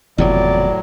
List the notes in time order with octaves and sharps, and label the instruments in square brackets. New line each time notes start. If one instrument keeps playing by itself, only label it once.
[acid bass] F#1 [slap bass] E2 C3 F3 [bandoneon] A2 F#3 [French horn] D5